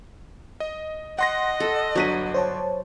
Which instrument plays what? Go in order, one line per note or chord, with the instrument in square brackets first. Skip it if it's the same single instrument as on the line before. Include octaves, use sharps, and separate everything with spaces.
[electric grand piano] D#5
[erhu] D#5 [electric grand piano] F#5 C6 A#6
[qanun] A4
[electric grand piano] G1 D4 D#7 [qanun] F#3 B4
[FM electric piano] C5 C#5 A5